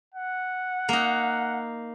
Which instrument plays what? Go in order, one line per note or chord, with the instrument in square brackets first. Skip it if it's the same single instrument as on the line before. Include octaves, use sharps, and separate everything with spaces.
[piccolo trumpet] F#5
[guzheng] A#3 D#4